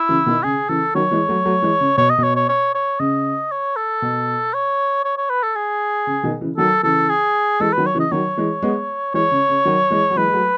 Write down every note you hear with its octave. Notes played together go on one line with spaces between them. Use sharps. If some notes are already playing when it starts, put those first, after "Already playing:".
Already playing: E4
C#3 E3
B2 D#3
C#3 G#4
C#3 E3 A4
D#3 F#3 C#5
E3 G#3
F#3 A3
F#3 A3
E3 G#3
C#3
B2 C#5
D#5
B2 C#5
C#5
C#5
C#5
C#3 D#5
C#5
A4
B2
C#5
C#5
C#5
B4
A4
G#4
C#3
B2 D#3
C#3 E3
D#3 F#3 A4
C#3 E3 A4
G#4
E3 G#3 A4
D#3 F#3 B4
C#5
C#3 E3
D#5
D#3 F#3 C#5
E3 G#3
G#3 B3
E3 G#3 C#5
C#3
C#3
D#3 F#3
E3 G#3
F#3
E3 G#3 B4
G#3
F#3 A3